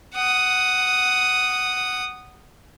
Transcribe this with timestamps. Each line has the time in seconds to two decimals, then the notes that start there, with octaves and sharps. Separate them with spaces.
0.15 F#5 D#6